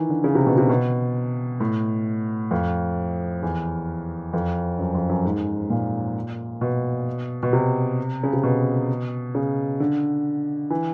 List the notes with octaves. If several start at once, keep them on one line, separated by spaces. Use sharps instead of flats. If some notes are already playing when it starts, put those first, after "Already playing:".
Already playing: D#3 E3
D3
C#3
C3
B2
C3
B2
A2
F2
E2
F2
F#2
F2
F#2
G#2
A#2
B2
B2
C3
C#3
C3
B2
C#3
D3
E3